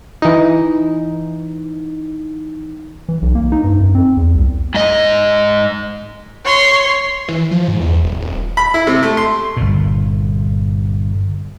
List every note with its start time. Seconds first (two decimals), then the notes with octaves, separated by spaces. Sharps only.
0.22 E3 D#4
3.09 E3
3.22 B1
3.35 A#3
3.52 D#4
3.64 G2
3.80 F#2
3.95 C4
4.17 E2
4.35 C2
4.74 G#2 D#5
6.45 C#5 C6
7.28 E3
7.51 F3
7.68 G#2
7.80 E2
8.04 D#1
8.20 D#1
8.57 B5
8.74 E4
8.87 C3
9.03 A3
9.17 C6
9.57 G1 A#2